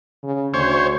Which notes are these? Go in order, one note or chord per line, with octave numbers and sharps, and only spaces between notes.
C#3
D2 C5 C#5